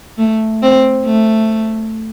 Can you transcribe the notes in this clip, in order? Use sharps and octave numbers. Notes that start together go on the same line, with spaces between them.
A3
C4
A3